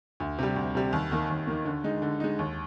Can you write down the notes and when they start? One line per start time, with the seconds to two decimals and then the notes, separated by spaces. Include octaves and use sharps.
0.20 D2
0.38 C3 G3
0.56 D2
0.75 C3 G3
0.93 D#2
1.11 D#3 A#3
1.30 D#2
1.47 D#3 A#3
1.65 D3
1.84 G#3 D#4
2.02 D3
2.20 G#3 D#4
2.39 D#2